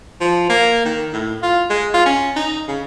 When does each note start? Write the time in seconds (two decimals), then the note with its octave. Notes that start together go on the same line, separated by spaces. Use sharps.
0.21 F3
0.49 A#3
0.85 D#3
1.13 A2
1.43 F4
1.70 G#3
1.94 F4
2.06 C#4
2.36 D#4
2.68 C#3